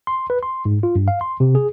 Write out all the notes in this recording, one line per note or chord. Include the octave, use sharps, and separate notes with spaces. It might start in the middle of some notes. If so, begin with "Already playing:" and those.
C6
B4
C6
G#2
F4
G2
F5
C6
C3
G#4